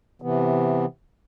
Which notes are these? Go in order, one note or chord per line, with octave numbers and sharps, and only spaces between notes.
C3 E3 B3